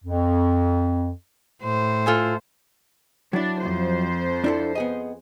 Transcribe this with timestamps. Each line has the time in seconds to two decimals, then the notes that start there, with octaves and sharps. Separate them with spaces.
0.04 F2
1.63 A2 C5
2.06 F4 A4 G#5
3.33 F#3 D4 E4
3.63 F2 C5
4.44 D4 E4 A4
4.75 B3 G#4 D#5